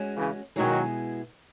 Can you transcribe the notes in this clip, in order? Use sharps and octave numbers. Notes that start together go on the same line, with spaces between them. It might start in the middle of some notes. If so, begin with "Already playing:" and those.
Already playing: G#3 C#4 F#4
C#3 E3
B2 D#3 F#3 G#3 B3 E4 G#4